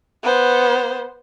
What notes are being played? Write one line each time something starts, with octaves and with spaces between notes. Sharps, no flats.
B3 C5